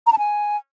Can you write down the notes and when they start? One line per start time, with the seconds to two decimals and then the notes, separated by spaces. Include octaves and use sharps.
0.07 A#5
0.12 A5
0.18 G#5